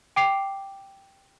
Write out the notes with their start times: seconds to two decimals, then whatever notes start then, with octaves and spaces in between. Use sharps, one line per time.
0.16 G5 D6 C7 F7